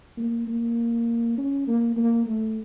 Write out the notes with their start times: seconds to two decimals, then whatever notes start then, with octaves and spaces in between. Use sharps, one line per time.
0.17 A#3
0.47 A#3
1.37 C#4
1.67 A#3
1.96 A#3
2.26 A3